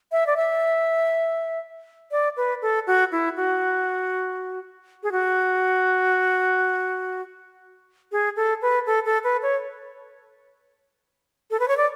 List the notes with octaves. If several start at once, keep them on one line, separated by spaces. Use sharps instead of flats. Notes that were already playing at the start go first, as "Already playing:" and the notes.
E5
D5
E5
D5
B4
A4
F#4
E4
F#4
G#4
F#4
G#4
A4
B4
A4
A4
B4
C#5
A4
B4
C#5
D5